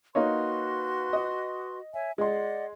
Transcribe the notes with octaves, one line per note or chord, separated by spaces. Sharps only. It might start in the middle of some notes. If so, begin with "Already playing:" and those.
A#3 D#4 F#4 B4 C#5 C6
D#5
C#5 E5 G#5
G#3 D5 D#5 F#5 C6